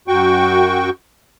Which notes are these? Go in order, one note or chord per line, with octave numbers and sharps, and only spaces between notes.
F#2 F#4 G5 C#6